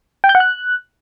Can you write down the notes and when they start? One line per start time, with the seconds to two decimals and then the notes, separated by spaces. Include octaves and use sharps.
0.24 G5
0.29 G6
0.35 F#5
0.40 F#6